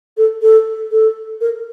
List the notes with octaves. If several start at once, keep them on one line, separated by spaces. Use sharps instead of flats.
A4
A4
A4
A#4